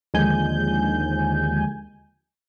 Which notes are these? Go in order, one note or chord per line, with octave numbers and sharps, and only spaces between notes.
D#2 D3 F3 G#3 G#5 G6